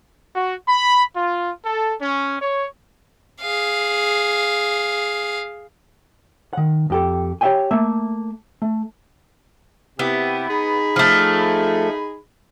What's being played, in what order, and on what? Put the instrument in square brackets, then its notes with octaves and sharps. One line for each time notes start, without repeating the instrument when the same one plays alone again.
[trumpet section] F#4
B5
F4
A4
C#4
C#5
[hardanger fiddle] G#4 F5
[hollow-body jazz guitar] D#3 F#5
F2 G4 A4
G4 C#5 D5 E5 G5 G#5
A3 A#3 E5
A3
[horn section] C3 E4 G4 [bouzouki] B3
[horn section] D#4 G#4 B5
[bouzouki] F3 A3